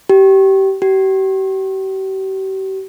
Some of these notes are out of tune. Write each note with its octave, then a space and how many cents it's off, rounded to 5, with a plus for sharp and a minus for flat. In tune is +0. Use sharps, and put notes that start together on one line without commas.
G4 -25
G4 -40